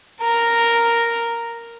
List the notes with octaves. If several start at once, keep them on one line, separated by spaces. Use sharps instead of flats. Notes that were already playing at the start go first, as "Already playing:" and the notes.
A#4 A#5